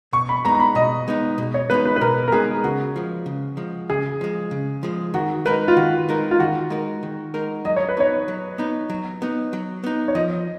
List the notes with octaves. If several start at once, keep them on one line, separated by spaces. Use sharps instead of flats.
B2 C#6
B5
G#3 B3 D#4 A#5
A#5
B5
B2 D#5
G#3 B3 D#4
B2
C#5
G#3 B3 D#4 B4
B4
B4
B2 A#4
A#4
G#3 B3 D#4 G#4
C#3 F#4
F3 G#3
C#3
F3 G#3
C#3 G#4
F3 G#3
C#3
F3 G#3
D#3 F#4
G#3 D#4 A#4 B4
F4
D#3 F#4
G#3 D#4 A#4
F4
D#3 F#4
G#3 D#4 A#4
D#3
G#3 D#4 A#4
F#3 D#5
C#5
B4
B3 D#4 C#5
F#3
B3 D#4
F#3
B3 D#4
F#3
B3 D#4
C#5
F3 D#5